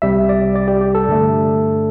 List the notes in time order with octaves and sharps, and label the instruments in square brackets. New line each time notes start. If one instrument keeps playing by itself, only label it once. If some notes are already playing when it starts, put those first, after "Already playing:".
[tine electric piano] C2 C3 G3 E5
D5
D5
G4
G4
A4
G2 D3 A3